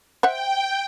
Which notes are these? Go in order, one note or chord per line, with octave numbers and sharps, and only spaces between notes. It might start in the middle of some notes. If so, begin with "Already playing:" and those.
C5 E5 F#5 G5